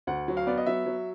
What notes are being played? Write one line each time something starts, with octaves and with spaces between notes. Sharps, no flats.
D2 F#5
F#3
F5
B3 D5
D#5
F#3 E5
F#3